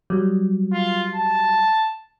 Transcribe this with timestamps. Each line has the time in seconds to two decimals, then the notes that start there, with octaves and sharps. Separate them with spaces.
0.10 F#3 G3
0.73 F4
1.15 A5